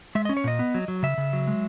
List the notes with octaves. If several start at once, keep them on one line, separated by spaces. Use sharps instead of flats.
G#3 E5
C#4 D#5
C#5
A#2 D#5
B3
F#3
F#3
C#3 E5
C#3
F#3
G#3